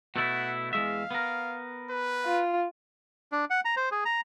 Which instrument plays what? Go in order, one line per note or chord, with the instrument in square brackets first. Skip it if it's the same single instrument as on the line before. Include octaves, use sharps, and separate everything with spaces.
[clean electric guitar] B2 A3 E4 [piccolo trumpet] F#5
[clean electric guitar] E2 G#3 E5 [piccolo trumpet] F5
[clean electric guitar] B3 A#4
[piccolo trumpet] B4
[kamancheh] F4
[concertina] D4
F#5
A#5
C5
G#4
A#5